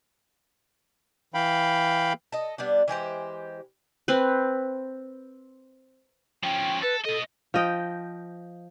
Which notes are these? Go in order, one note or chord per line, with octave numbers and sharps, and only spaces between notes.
E3 F5 G5 B5
A4 D#5
G3 B3 D4
E3 G#3 G4 C5
C4 B4
F3 C#4 G5
A4 B4
B2 A4 D#5
F3 D#5 G5